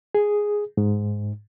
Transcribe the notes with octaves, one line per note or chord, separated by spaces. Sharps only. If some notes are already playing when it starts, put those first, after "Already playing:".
G#4
G#2